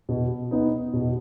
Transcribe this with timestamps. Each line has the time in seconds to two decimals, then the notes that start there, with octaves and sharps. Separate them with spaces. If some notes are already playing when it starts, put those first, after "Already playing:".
0.09 B2
0.51 B3 D#4
0.93 B2